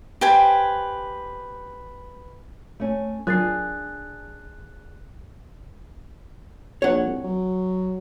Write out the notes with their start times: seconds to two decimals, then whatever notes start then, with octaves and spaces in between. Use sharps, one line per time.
0.21 G4 B4 C5 G#5
2.80 A3 C#4
3.27 F#3 D4 F4 G#4 A#4 F#6 A6 C7
6.82 A#1 C#5 F#5
7.06 C2
7.24 F#3